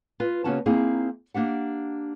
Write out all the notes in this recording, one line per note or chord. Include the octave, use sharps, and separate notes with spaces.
F4 B4
C#3 A#3 B3 C#4 F#4 A5
A#3 C4 D#4 E4 G#4
A#3 D4 G4 F#5